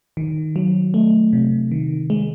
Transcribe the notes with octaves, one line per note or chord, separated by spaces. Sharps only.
D#3
F#3
A3
C3
D#3
G#3